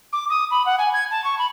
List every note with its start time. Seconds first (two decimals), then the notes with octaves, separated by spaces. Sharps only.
0.13 D6
0.30 D#6
0.51 B5
0.66 F#5
0.79 G#5
0.93 G#6
1.11 A5
1.24 C#6
1.39 B5